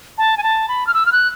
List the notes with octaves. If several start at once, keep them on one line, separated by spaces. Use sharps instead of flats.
A5
G#5
A5
B5
F6
E6
F6
F#6